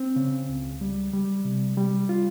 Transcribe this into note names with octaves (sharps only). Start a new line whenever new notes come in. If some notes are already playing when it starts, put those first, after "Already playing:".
Already playing: C4
C#3
C#2
G3
G3
C3
G3
F4